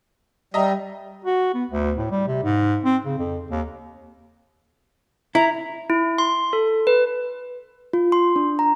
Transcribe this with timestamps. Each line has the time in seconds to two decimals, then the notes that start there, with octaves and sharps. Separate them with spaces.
0.54 G3 D#5 E5 A#5
1.25 F#4
1.54 B3
1.70 D2
1.98 A2
2.11 G3
2.27 C3
2.44 G#2
2.83 C4
3.05 C#3
3.18 F2
3.51 D#2
5.35 E4 A#5
5.90 E4
6.18 C6
6.53 A4
6.87 B4
7.93 F4
8.12 C6
8.36 D4
8.59 A#5